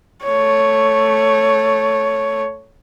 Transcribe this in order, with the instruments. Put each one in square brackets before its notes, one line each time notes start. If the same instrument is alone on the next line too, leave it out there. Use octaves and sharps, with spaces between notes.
[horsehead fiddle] A3 C#5